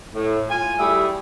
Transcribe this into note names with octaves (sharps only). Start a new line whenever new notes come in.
A2
F4 G#5
G3 A3 E4 G4 G#4